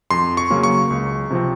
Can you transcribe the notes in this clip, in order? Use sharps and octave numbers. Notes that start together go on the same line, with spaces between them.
F2 C6
C#6
C#3 F#3 A#3 C#4
C#6
C#2
C3 F3 C4